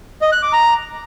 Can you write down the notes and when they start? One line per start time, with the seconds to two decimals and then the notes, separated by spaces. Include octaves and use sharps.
0.22 D#5
0.32 F#6
0.42 D6
0.53 A#5